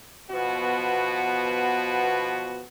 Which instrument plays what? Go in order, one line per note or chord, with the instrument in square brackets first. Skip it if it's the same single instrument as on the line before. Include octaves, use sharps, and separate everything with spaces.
[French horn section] B2 F3 B3 F#4